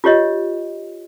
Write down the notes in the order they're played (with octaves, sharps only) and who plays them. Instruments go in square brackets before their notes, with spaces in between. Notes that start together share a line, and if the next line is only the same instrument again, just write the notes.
[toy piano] F4 G4 C#5 D#5